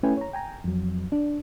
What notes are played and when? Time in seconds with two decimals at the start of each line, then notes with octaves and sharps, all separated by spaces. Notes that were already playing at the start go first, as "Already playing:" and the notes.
0.03 A3 C#4 E4 B4 G5 G#5
0.17 C#5 A#5
0.33 G5 G#5 A#5
0.64 F2 F#3
1.12 D4